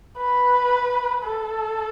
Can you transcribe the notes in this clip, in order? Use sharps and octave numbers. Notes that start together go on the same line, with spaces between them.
B4
A4